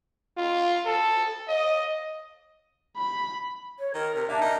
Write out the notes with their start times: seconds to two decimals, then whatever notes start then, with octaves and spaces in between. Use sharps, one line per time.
0.37 F4
0.86 A4
1.48 D#5
2.97 B5
3.79 C#5
3.94 D#3 A#4
4.16 C3 A#4
4.29 A#3 D4 E5 A5
4.41 D#4 A#4